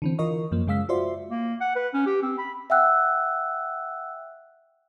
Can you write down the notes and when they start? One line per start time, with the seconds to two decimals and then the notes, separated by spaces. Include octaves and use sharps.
0.02 D3 E3 C4
0.19 E3 F4 A#4 D#5 C#6
0.52 F#2 F3 A#3
0.67 F#2 C#3 G#3 F5 E6 B6
0.89 F4 F#4 C5 D5 E5 C6
1.31 A#3
1.61 F#5
1.75 B4
1.94 C#4
2.06 G4
2.23 C4
2.38 B5
2.70 E5 F#5 G5 E6 F#6